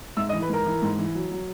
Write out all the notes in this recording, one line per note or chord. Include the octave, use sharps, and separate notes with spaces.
G#2 E5 E6
D#5 D#6
E3
B4 B5
G#2 A#4 A#5
E3
G#2
E3
F#3
F#3